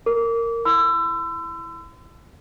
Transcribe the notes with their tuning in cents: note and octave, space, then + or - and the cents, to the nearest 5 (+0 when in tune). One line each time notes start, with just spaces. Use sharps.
A#4 -15 D6 -30
E4 +0 C6 -45 E6 +25